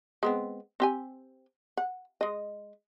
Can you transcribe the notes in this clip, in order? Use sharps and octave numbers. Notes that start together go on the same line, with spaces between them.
G#3 B3 C4
C4 G4 G#5
F#5
G#3 D#5